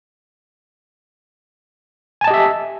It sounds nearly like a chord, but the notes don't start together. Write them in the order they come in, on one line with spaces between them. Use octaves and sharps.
G#5 A5 D#5 G4 E5